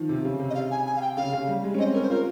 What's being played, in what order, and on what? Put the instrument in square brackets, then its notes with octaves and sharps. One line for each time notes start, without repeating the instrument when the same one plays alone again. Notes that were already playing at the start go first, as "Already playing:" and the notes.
Already playing: [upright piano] D#3 F3
C3
C#3
C3
[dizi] D#5
F5
G#5
G#5
F5
G5
[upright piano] C#3 [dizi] F5
[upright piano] C#3
G3
G#3
C#4
[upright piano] C4 [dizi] D#5
[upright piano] C#4 [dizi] A#4
[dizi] C5
[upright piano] F4 [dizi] A#4